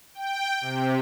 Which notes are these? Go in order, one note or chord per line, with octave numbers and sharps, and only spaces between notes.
G5
C3